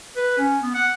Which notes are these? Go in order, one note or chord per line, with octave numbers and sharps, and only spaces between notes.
B4
C#4
B3
F#5